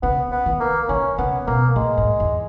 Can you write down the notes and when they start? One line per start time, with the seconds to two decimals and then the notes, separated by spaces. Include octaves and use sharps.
0.02 C#3 B3
0.32 B3
0.46 D#3
0.60 A#3
0.89 D#3 C#4
1.18 C#3 B3
1.47 B2 A#3
1.76 A#2 G#3
1.97 G#2
2.20 E2